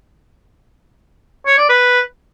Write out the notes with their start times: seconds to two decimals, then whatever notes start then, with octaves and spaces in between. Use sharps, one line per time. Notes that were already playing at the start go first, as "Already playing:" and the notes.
1.47 C#5
1.58 D5
1.69 B4